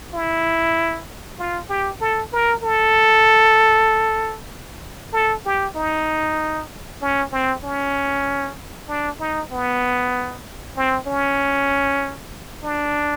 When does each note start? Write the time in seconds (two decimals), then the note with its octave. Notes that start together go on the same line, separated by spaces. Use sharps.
0.14 E4
1.39 F4
1.70 G4
2.01 A4
2.33 A#4
2.63 A4
5.13 A4
5.45 G4
5.76 D#4
7.02 C#4
7.32 C4
7.64 C#4
8.89 D4
9.20 D#4
9.52 B3
10.77 C4
11.07 C#4
12.64 D4